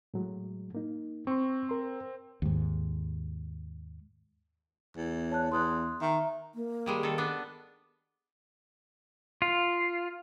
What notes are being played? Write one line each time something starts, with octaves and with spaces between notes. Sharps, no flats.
A2 F#3 G#3
A#3 D#4
C4 C6 C#6
A#4 C6
D#2 G#2
E2
C#5 A5 F#6
E2 C6 D#6 F#6
D#3 E5 A#5
A#3
D#3 G3 G#3
D#3 A4
B3 D4
F4